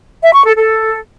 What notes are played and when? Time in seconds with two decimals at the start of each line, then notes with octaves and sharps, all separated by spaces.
0.22 E5
0.33 C#6
0.45 A4
0.57 A4